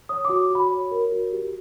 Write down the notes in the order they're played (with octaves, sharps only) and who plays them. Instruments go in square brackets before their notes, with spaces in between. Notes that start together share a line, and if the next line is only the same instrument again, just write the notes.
[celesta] C#5 D#6
D6
F#4
F#4 B5
C#5
A#4
F#4
G4